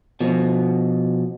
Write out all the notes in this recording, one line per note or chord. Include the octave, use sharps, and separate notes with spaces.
B2 F3